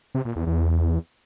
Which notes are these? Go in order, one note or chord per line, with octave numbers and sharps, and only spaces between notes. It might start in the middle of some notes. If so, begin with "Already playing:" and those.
C3
A#2
E2
E2